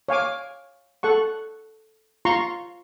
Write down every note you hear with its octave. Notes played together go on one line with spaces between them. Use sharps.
C#5 F5 G#5 D6
A4 F#5 C#6
F4 A#5 C6 C#6